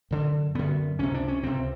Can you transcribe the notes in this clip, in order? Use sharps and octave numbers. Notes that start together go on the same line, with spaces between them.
F#2 D3
F#2 D3 B3
C#2 C3 C#4
D4
C#4
C#2 C3 C4